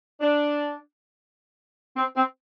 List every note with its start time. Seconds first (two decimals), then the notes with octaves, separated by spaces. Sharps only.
0.21 D4
1.96 C4
2.15 C4